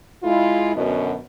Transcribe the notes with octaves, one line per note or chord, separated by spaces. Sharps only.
G#3 E4 F4
F#2 B2 D3 B3 C#4 D#5